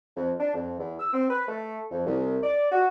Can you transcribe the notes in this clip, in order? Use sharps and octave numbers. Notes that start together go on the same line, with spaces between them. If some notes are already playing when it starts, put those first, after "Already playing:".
F2
D4
F2
E2
E6
C4
B4
A3
F2
C2
D5
F#4